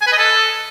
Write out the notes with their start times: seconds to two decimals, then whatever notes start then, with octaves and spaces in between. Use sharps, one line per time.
0.02 G#5
0.07 B4
0.13 D#5
0.18 A4